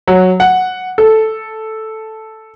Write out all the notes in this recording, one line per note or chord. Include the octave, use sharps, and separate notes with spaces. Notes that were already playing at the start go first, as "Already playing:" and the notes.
F#3
F#5
A4